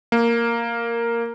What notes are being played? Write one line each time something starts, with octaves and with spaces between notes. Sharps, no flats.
A#3